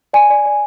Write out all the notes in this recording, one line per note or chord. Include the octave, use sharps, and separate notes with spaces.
D5 G#5
D5
D5